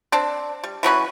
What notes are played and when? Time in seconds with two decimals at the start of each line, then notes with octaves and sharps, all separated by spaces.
0.12 C4 D4
0.64 G3
0.83 E3 F#3 C#4 B4